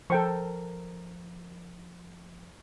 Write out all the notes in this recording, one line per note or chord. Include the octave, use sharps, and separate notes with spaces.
F3 A4 A#4 C5 G5 C#6